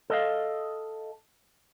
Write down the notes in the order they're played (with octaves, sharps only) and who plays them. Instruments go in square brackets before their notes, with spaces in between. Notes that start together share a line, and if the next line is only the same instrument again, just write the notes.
[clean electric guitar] A4 D#5 F5